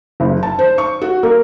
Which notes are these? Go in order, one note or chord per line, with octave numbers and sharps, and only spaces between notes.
F#1
A5
C5
C#6
F#4
A#3